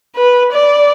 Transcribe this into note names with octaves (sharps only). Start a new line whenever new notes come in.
B4
D5